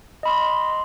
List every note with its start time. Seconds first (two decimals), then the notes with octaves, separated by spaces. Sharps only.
0.23 D#5 B5 C6